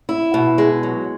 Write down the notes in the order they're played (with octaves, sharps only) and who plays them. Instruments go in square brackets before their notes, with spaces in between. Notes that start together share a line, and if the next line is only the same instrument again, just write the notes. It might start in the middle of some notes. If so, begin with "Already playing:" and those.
[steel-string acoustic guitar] E4
B2
G#3
F#3